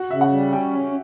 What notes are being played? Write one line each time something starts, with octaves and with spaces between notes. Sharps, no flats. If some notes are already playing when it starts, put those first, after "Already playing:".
Already playing: F#4 F#5
C#3 E5
F#4 F#5
G3
C#4 G4 G5
C#3